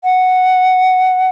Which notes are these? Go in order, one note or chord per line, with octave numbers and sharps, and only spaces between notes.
F#5